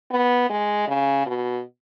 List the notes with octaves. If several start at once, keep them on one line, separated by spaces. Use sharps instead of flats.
B3
G#3
C#3
B2